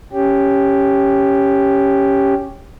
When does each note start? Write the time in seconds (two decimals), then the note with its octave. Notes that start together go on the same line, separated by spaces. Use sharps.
0.13 C#4 G4